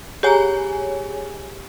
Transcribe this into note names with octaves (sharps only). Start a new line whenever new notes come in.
G4 G#4 C#5 G#5 A#5